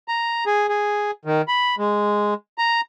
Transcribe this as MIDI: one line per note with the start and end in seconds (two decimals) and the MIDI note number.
0.08 0.44 82
0.46 0.67 68
0.69 1.11 68
1.25 1.42 51
1.48 1.75 83
1.78 2.34 56
2.58 2.81 82